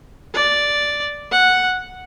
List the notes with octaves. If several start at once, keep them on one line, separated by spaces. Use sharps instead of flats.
D5
F#5